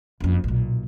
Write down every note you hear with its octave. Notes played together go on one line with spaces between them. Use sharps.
F#1 F2
B1 A#2